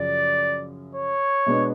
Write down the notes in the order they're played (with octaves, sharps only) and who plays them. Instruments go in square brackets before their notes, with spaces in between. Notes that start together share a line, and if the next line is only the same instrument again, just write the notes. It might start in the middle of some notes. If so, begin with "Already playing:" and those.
Already playing: [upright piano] F#2 C#3 F3 [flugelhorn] D5
[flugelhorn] C#5
[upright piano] B2 G#3 B3 D4